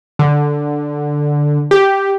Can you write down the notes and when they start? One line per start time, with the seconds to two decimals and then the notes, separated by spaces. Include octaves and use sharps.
0.19 D3
1.71 G4